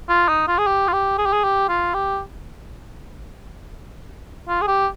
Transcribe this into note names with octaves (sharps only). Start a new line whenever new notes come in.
F4
D#4
F4
G#4
G4
F4
G4
G#4
G4
G#4
G4
F4
G4
F4
G#4
G4